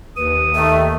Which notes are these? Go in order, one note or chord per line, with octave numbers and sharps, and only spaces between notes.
D#2 B4 D#6
D#3 A3 E5